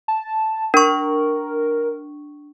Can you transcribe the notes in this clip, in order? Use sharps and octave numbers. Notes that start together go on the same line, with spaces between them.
A5
D4 A#4 C#6